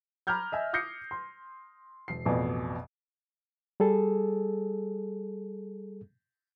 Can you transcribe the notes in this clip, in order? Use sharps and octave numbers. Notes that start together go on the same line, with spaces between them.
A#5 B5 D6 F6 G6 G#6
D#5 E5 G#5
D6 D#6 G6 A#6 C7 C#7
C6
E1 C7
A1 F2 B2 D5 G#5
G3 G#4 A4